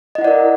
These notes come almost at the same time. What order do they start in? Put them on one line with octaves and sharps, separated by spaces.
D#5 E4 F#5 D5 A#4